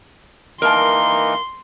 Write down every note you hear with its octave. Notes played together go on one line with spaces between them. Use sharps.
E3 A#3 D#4 A#4 A5 C6